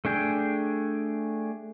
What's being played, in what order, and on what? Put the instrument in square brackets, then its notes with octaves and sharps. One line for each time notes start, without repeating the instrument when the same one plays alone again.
[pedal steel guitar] A3 D4 G#4 G5